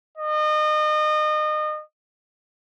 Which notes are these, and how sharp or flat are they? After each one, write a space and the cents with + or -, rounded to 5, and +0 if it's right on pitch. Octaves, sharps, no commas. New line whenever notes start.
D#5 -30